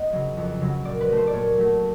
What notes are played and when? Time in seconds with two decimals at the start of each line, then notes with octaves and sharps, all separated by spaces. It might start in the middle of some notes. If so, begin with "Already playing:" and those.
Already playing: B3 D#5
0.12 C#3 F#3
0.37 F2
0.61 C#3 F#3
0.85 A#2 D5
1.01 B4
1.09 F#3 A3
1.17 C5
1.27 D5
1.33 A#2 C#5
1.57 F#3 A3